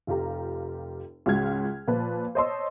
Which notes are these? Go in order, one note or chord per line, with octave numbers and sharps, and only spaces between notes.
F1 F4 G4 A#5
C#2 G#2 F4 F#4 F6 G#6
A#2 F3 B4 A5
C5 C#5 D#5 A5 C6 E6